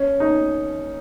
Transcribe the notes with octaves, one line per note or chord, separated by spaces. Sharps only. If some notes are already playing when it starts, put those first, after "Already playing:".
Already playing: C#4
D#4